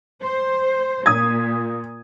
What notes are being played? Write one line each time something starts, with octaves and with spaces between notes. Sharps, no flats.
C5
A#2 D#6 G#6